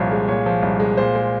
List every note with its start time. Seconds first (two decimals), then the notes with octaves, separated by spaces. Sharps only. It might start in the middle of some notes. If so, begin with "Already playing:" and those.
Already playing: C2 A#2 F3 C#5
0.11 G#3
0.28 A#2 C#5
0.46 F3
0.62 C2
0.80 G#3
0.97 A#2 C5
1.15 G#3